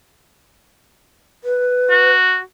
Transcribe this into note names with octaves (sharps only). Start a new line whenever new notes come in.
B4
F#4